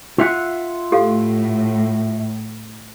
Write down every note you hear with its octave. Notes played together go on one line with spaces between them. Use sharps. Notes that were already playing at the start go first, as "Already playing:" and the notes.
F4 E5 F#5
A2 G4 A4 F5